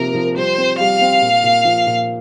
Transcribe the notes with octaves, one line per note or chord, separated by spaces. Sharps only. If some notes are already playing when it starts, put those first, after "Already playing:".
Already playing: C3 F3 A#3 A#4
F3
G3 C5
C4
G3 F5
C4
A#2
A#2
F3
A#2